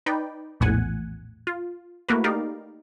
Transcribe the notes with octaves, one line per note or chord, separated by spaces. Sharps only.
D#4 B4 D5 G5
A#1 E2 A2 F#5 G#5
F4
A3 A#3 E4 F#4 A#4 B4
D#4 G4 A#4 D5 F5